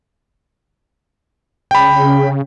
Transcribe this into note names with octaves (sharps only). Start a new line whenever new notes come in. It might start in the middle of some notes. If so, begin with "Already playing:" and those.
C#3 G5 B5